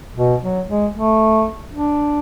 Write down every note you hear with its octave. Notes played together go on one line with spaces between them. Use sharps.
B2
F#3
G#3
A3
D4